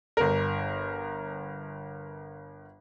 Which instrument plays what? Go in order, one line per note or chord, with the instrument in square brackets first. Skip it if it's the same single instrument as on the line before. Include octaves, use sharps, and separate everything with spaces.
[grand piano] G1 A#4